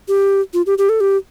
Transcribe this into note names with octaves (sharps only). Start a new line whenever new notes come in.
G4
F4
G4
G4
A4
G4